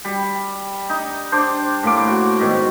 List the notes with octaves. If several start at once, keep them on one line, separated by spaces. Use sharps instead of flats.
G3
D#4
D4 C5 D6
A2 A#3 D6
F#4
G#2 B2 D#3